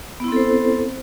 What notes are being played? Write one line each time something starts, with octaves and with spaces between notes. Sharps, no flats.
B3 C4 E4 A4 C5